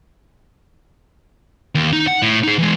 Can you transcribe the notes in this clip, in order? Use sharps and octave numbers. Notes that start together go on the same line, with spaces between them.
D#2
D#4
F#5
A2
D#4 G#4
E3 G#3